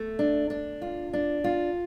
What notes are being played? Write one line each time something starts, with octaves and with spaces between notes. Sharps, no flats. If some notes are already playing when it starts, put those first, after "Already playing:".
Already playing: A3
D4
D4
F4
D4
F4